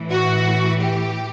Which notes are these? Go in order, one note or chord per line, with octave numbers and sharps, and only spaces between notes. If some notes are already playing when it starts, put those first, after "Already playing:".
Already playing: A2 E3
F#4
G4